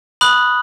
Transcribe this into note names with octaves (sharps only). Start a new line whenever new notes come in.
B5 D#6 F#6 F#7